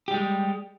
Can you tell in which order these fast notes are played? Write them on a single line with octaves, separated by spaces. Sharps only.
G4 G3 G#3